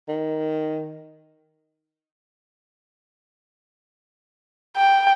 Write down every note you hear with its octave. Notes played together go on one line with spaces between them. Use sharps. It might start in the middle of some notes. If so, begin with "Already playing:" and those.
D#3
G5